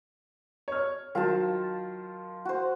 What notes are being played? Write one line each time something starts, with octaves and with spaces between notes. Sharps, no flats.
C#5 F6
D#3 F#3 F4 A5
F#4 C5